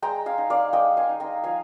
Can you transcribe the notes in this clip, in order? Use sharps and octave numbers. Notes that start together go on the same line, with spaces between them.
G#3 G5 A#5
F5 G#5
D#4
D5 F5
G#3 D#5 G5
F5 G#5
D#4
G5 A#5
F3 F5 G#5